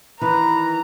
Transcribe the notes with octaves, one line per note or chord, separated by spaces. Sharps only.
D#3 E3 B4 A#5